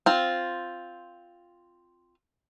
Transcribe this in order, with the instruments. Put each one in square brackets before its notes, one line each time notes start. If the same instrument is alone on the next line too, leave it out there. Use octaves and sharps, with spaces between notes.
[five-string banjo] C4 F4